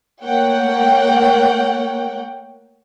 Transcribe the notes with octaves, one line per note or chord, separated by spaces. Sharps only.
A3 A#3 C#5 F#5 G5